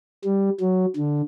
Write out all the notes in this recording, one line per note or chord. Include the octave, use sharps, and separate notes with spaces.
G3
F#3
D3